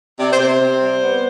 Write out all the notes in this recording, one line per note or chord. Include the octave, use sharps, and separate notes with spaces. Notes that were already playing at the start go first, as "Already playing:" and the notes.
C3 D5
C5
C3
C5
C3
G3
B3